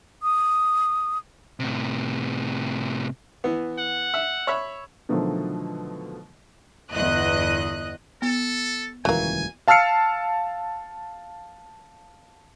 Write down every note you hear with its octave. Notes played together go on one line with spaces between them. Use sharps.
D#6
A2 C3
E3 B3
F#5
E5
C#5 E5 B5
B2 D3 D#3 F3 F#3 A3
G1 E2 D#5 F#6
B3 A4
D#1 C#2 E3 F#3 A#3 G#5
F5 A5 E6 F6 C7 C#7